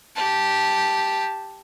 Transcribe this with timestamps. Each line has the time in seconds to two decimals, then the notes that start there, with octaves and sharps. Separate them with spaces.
0.15 G4 A5